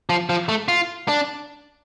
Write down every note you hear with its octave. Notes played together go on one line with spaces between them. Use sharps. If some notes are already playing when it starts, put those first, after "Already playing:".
F3
F3
A3
F4
D4